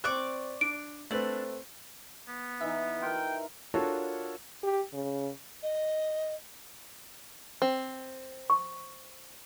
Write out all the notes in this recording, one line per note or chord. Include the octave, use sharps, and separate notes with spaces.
C4 D5 C#6 D6 F#6
D4 D7
A3 C4 D4 B4
B3
E3 D#4 E5
F4 A#4 G5
D4 F4 F#4 A4 A#4 C#5
G4
C#3
D#5
C4
C#6